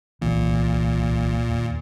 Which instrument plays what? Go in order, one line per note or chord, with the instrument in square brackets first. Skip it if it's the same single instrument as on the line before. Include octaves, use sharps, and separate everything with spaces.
[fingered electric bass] D1 C2 E3 [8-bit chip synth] A#2
[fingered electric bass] D#2